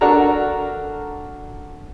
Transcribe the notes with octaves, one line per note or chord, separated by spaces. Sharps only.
D4 F#4 A4 A#4 A#5